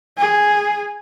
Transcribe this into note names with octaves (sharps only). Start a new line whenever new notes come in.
G#4